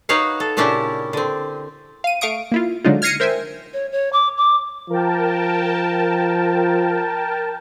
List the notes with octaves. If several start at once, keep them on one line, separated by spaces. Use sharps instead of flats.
D#4 F#4 B4 C#5 F5
A4
A#2 C#3 C#4 D4 E4 G4
D3 C4
F5 D#7
A3 F5 C#6 D#6 D7
A#3 E4 F4
D3 F#3 G#3 D4 D#4 F4
F6 G#6 A#6 C7 C#7 D#7
A#4 C5 E5 G5 G#5
C#5
C#5
D6
D6
F3 A#4 G5 A5